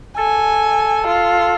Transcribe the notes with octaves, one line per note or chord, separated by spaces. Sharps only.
A4 G#5
F4